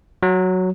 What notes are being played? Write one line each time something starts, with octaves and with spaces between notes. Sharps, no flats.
F#3